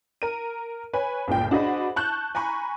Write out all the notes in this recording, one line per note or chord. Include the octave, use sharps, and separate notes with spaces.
A#4 D#7
B4 C#5 G#5
G1 C#2 A#2 G5
D4 F#4 G#4 C5 D#5 B5
A5 C#6 F#6 G6
G#5 A#5 B5 C#6